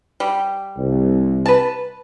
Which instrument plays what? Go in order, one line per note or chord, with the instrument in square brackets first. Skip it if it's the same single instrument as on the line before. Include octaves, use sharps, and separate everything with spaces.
[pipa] G3
[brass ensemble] C2
[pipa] B4 A5